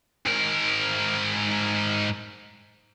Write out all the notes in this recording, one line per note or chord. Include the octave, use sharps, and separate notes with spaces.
G#2 A#4